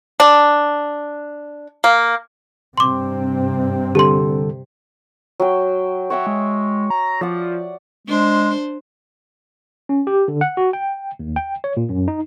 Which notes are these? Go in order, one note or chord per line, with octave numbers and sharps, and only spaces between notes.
D4
A#3
G2 C3 C4 C6 D6
D3 G3 G4 A4 C6
F#3 G5
F#4 C#5 E5 G5
G#3
A#5
F3 D5 F#5
G#3 D4 C5
C#4
G4
D3
F#5
F#4
G5
D#2
G5
C#5
A#2
F#2
D#4